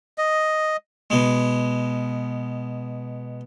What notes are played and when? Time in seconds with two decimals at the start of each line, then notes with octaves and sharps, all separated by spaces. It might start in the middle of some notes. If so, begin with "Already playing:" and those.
0.18 D#5
1.10 B2 G#3